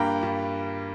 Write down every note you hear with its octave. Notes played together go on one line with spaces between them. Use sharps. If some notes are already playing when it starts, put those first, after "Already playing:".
Already playing: G2 G3 A#3 G5 A#5 B5
G2